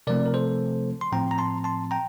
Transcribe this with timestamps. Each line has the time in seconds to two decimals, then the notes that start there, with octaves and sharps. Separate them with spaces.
0.07 C3 F3 A3 C4 A#4 D5
0.26 A#4
0.34 A4 C5
1.01 C6
1.12 A2 F3 C4 G5 A#5
1.31 A#5
1.38 A5 C6
1.64 A5 C6
1.91 G5 A#5